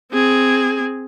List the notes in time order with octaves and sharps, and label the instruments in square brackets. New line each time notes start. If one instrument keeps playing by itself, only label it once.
[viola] C4 G#4